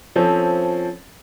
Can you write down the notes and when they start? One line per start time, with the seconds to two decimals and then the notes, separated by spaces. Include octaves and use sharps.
0.16 F3 C4 C#4 A4